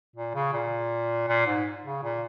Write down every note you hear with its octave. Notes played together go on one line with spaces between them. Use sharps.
A#2
C#3
A#2
A#2
G#2
C#3
A#2